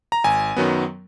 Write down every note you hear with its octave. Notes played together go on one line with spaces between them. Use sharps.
A#5
G#1 G#5
F#2 D#3 F#3 B3